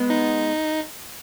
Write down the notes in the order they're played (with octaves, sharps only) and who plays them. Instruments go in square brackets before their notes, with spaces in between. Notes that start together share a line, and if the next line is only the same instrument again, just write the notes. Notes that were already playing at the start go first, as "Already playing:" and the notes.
Already playing: [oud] G#3 B3
[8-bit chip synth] D#4